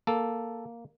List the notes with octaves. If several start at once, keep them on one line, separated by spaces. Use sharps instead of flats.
A#3 A4